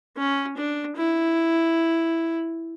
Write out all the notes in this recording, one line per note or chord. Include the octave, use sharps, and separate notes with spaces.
C#4
D4
E4